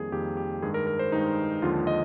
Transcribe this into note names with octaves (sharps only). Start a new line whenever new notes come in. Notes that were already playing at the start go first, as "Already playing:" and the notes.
Already playing: F2 D#3 G3 A#3 G#4
F2 D#3 G3 A#3 G4
G4
G2 D#3 G#3 G#4
A#4
A#4
C5
G2 D#3 G#3 D#4
D#2 D3 F3 G#3 F4
D#5